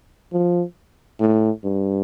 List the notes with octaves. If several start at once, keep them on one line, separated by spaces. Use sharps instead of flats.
F3
A2
G2